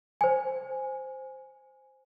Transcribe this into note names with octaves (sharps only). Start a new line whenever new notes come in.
C5 G#5